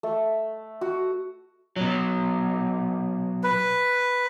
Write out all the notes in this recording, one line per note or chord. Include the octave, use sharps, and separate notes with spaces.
A3
F#4
B2 F#3
B4